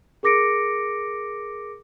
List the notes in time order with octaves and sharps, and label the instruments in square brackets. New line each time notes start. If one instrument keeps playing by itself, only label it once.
[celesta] G#4 A#4 D6 A#6 C#7 D7